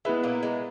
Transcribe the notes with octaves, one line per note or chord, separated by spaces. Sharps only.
G#3 B3 E4 B4 E5
A#2 A#3
G#3